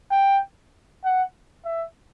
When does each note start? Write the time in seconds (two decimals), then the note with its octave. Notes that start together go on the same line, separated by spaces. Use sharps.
0.11 G5
1.04 F#5
1.65 E5